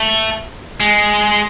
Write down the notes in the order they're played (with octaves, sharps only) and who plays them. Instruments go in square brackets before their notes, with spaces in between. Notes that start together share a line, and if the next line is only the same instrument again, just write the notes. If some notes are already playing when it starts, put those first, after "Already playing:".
Already playing: [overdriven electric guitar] A3
G#3